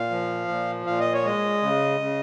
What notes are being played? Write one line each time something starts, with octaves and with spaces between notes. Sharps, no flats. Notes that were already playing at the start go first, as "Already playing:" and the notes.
Already playing: A#2 F5
F3
A#2
A#2 F5
D#5
C#5
G#3 D#5
C#3
C#3